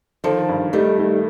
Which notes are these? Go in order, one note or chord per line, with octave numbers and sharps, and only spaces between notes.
D3 D#3 F3
G2
D#3 G3 A3
A3